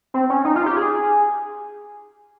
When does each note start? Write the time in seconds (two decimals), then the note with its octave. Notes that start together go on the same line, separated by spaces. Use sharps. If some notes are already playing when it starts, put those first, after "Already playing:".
0.14 C4
0.30 C#4
0.45 D#4
0.56 F4
0.66 G4
0.76 G#4